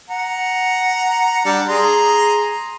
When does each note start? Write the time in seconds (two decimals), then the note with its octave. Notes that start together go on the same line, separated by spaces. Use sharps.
0.10 F#5 A#5
1.45 G3 D4
1.68 G#4 A#5 C6